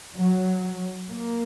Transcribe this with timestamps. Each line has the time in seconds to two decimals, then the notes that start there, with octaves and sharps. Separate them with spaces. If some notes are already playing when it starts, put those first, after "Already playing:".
0.15 F#3
1.09 A#3